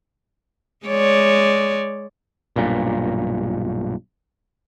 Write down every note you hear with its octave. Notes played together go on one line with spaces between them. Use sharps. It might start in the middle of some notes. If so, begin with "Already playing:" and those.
G#3 C#5 D5
B1 G2 A#2